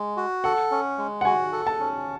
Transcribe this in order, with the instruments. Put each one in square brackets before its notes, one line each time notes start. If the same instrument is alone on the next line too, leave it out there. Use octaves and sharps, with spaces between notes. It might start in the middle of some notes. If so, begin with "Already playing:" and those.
Already playing: [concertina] G#3
F#4
[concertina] A4 [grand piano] F#5
[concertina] C#4
G#3
[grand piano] F#5
[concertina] F#4 [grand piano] G#5
[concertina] A4
[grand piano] A5
[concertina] C#4